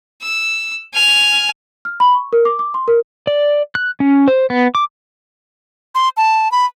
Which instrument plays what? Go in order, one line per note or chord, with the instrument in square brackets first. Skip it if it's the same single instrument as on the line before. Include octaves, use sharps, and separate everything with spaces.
[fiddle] E6
G#5 F6
[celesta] F6
B5
C#6
A#4
D6
D6
C6
A#4
[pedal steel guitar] D5
F#6
C#4
C5
B3
D6
[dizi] C6
A5
B5